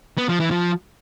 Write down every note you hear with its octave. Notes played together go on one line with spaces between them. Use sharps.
B3
F3
E3
F3